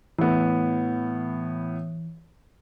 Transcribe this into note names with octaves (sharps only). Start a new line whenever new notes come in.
A2 E3 B3